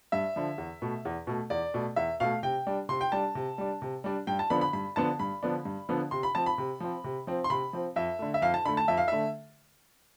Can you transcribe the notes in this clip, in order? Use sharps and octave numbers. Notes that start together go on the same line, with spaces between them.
G2 E5
D3 F3
E2
B2 A3
E2
B2 A3
E2 D5
B2 A3
E2 E5
B2 A3 F5
C3 G5
G3 D4
C3 C6
G5
G3 D4 A5
C3
G3 D4
C3
G3 D4
G2 G5
A5
D3 F3 B3 D4 B5
B5
G2 B5
D3 F3 B3 D4 A5
G2 B5
D3 F3 B3 D4
G2
D3 F3 B3 D4
C3 C6
B5
F3 C4 A5
B5
C3
F3 C4
C3
F3 C4
C6
C3 B5
F3 C4
F2 E5
D3 A3
E5
F2 F5
A5
D3 A3 B5
A5
F2 E5
F5
D3 A3 E5